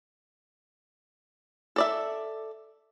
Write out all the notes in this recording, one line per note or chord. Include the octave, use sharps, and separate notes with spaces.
A4 D5 E5